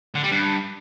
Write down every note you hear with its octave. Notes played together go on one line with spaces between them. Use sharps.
D3
G3
G2